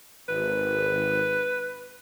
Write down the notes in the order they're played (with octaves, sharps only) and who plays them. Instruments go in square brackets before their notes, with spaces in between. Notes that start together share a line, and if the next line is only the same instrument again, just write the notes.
[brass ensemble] G#1 [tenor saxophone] B4